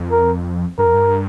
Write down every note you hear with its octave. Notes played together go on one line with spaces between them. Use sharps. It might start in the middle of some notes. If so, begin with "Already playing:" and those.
Already playing: F2
A#4
G2 A#4
F2
G2